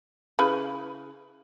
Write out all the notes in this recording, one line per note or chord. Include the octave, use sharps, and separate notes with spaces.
C#3 E4 B4